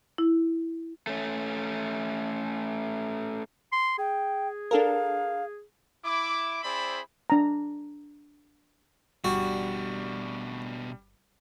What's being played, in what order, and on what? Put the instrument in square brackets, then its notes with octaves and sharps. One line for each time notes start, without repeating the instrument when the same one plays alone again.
[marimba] E4
[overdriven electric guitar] A3 C#4
[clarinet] C6
[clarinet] G#4 [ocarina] G5
[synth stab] D4 A4 A#4 [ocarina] F5
[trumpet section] E4 D6
C4 E4 G#4 C5 D5 B5
[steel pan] D4 A#5
[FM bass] G1 [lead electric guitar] B2 D4 [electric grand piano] G3 [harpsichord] F#4